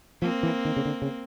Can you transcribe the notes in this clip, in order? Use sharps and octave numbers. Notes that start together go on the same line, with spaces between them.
F3 A#3 C4
E3
D#3
C#3
D3
C#3